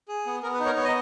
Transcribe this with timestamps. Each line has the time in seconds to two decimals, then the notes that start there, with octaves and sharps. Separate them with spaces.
0.08 G#4
0.26 B3
0.43 B3 A#4
0.54 B4
0.59 D#4
0.65 A#4 C#5
0.77 B3 C#5
0.85 D#5